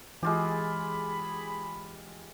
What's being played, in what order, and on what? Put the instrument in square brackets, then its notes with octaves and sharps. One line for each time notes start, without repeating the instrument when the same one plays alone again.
[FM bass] E3 [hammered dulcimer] G#3 F4 G4 [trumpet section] G#4 B5